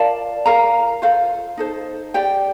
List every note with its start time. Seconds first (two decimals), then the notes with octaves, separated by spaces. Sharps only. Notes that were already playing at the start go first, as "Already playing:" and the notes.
Already playing: F4 A#4 D5 A5
0.46 F4 A#4 F5 A#5
1.02 F4 A4 C5 F5
1.57 D#4 A4 C5
2.14 G4 D5 G5